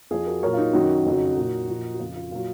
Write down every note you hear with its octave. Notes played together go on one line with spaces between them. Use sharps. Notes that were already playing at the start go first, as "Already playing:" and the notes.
F2 F3 F4 G#4
F#4 A#4
A#2 F#3 A#4 C#5
F4
D#4
F#2 D#3 F#3 D#4 F#4
F2 C#3 F#3
A#2 F#3
A#2 F3
F#4
F2 C#3 F3 F4
F4
A#2 F#3 F4